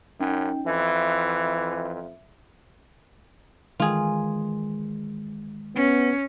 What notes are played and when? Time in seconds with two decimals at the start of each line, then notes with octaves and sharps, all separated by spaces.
0.20 F#2 C#4 D#4 G5
0.67 F2 E3 E5
3.80 D#3 E3 G#3 F4 G#4
5.76 B3 C#4